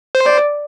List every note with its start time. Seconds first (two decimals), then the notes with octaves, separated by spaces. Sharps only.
0.15 C5
0.26 D5